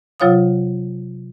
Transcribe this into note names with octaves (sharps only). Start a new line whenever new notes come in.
C3 F#3 F4 C#5 F5 D#6